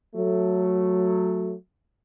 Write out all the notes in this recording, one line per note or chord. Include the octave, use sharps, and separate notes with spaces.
F#3 A3